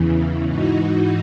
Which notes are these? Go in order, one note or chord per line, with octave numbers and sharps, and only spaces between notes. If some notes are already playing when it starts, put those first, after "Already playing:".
Already playing: E2 C#3 E3
G#2 E3 D#4 F#4